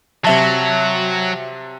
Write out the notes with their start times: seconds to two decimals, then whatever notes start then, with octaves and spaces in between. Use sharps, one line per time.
0.25 C3 F#3 E5 A5